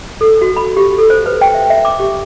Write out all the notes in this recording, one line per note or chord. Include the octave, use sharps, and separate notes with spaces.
A4
F#4
B5
G4
A4
C5
B4
G5
E5
E5
D6
G4